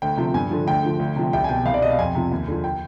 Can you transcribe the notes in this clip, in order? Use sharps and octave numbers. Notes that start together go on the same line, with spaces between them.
D2 G5
C3 F3
G2 G#5
D3 F3
D2 G5
D3 F3
D2
C3 F3
C2 G5
G#5
B2 G5
C2 F5
D5
B2 D#5
F5
F2 G#5
C3 F3
D#2
D3 F3
G5